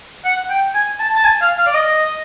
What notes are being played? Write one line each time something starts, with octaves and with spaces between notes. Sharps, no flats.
F#5
G5
G#5
A5
A5
G#5
F5
F5
D5
D#5